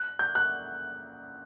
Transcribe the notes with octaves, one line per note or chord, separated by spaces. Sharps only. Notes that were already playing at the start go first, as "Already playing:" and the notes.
Already playing: F#6
G6
F#6